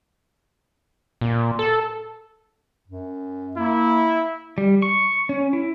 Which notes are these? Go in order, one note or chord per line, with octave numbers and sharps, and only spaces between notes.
A#2
A4
F#2
A#3 E4
G3
C#6
C#4
E4